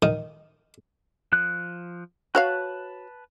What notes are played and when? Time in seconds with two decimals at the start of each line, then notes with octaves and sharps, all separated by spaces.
0.02 D#3
1.32 F3 F#6
2.35 F#4 B4 C#5 F5 A5 F#6